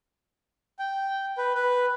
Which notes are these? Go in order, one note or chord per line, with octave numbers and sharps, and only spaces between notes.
G5
B4
B4